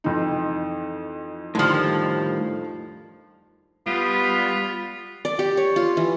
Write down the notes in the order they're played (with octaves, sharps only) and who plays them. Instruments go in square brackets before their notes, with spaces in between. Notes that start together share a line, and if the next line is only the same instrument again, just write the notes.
[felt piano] F2 E3 D#4
[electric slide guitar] A2 D#3 G3 [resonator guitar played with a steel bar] D3 F3
[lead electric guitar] G3 [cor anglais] B3 [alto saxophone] F4 [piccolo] B6
[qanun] D5
G4
C#5
F4
E3